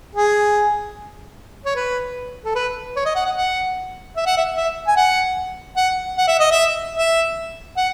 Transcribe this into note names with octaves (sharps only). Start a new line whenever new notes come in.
G#4
C#5
B4
A4
B4
C#5
D#5
F#5
F#5
F#5
E5
F#5
E5
E5
G#5
F#5
F#5
F#5
E5
D#5
E5
E5
F#5